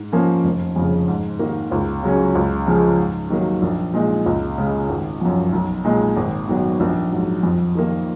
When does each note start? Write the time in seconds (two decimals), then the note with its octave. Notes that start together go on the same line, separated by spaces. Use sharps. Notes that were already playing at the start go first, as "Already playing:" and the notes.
Already playing: G#2
0.13 F3 A#3 C#4
0.44 F1
0.76 F2 C#3
1.08 G#2
1.39 D#3 A#3
1.71 C#2
2.03 C#3 F#3 C#4
2.35 C#2
2.67 C#3 F3 G#3
2.98 G#2
3.30 D#3 F#3 A#3
3.62 A#1
3.94 A#2 G#3 D#4
4.26 C#2
4.58 C#3 G#3
4.89 G#1
5.21 F#2 F3
5.53 B1
5.85 A#2 G#3 D#4
6.17 G#1
6.48 G#2 D#3 F#3 B3
6.80 A#1
7.12 G#2 F#3
7.43 F2
7.75 D#3 A#3